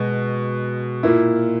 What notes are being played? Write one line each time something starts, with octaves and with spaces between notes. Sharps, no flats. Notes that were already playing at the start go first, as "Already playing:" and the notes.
Already playing: B2 G#3
A#2 A#3 E4